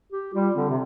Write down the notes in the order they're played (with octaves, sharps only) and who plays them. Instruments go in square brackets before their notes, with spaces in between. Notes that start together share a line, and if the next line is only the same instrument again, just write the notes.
[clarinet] G4
[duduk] G3 [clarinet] F4
[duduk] D3 [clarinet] C4
[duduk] C3